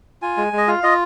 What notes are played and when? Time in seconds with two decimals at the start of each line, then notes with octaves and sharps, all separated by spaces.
0.22 F4 G#5
0.37 G#3
0.53 G#3 D#5
0.68 F4 F5
0.83 F4 D#5